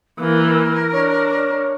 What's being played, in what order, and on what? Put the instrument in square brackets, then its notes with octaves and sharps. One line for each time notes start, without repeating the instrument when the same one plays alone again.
[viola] E3 [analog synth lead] A#3 [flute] A#4
[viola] D4 [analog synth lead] C#5